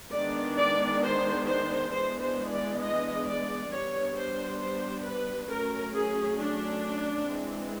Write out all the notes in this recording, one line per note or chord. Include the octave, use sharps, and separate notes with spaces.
D#3 G#3 B3 D4 D5
D5
C5
C5
E3 G#3 B3 D4 C5
C5
D5
D#5
D5
G3 B3 D4 C#5
C5
C5
B4
F#3 A3 C#4 A#4
G#4
D4
E3 G#3 C4